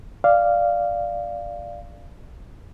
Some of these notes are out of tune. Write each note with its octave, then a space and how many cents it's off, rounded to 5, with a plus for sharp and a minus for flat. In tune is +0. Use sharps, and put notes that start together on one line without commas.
D5 +0 F5 -10